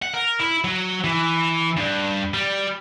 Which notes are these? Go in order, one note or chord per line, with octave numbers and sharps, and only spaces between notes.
F#5
A#4
E4
F#3
E3
G2
G3